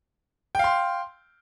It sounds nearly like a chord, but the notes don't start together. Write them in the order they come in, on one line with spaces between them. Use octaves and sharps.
G5 F5 C6